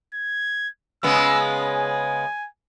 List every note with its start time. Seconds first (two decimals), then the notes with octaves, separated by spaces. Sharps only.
0.14 G#6
1.03 C#3 G#3 B3 E6
1.62 G#5